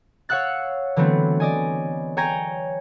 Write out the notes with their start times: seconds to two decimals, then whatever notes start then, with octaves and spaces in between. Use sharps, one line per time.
0.29 C#5 F5 F#5 E6 F#6 A6
0.96 D3 E3 F#3 A3 B3 C4
1.40 D5 D#5 G#5
2.17 C#5 G5 G#5 A#5 G#6 A#6